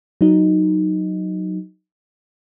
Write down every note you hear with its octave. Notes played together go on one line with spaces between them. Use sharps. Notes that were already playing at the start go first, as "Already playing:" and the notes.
F#3 D#4